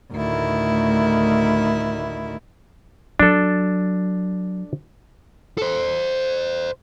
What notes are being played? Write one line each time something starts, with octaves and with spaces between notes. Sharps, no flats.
D2 A2 D#3 E4
F#3 D4 A4
A4 C5